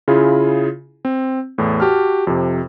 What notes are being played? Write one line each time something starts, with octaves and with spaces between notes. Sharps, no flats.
C#3 E4 F4 G#4
C4
E2 A2
F#4 G4 A5 F6
F2 C3